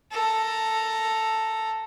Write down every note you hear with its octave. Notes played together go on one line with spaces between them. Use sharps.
A4 A#5